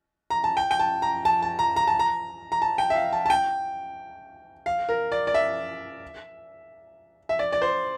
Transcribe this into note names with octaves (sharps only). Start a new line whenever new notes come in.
A#5
A5
G5
G5
A5
A#5
A5
A5
A#5
A#5
A5
A#5
A#5
A5
G5
E5
F5
A5
A5
G5
F5
A#4
D5
D5
E5
E5
D5
D5
C5